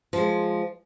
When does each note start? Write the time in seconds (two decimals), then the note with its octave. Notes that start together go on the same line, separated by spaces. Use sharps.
0.13 F3 G#3